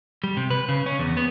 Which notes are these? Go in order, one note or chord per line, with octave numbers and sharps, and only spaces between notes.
G3
C3
B4
C#3
C#4
E2
B3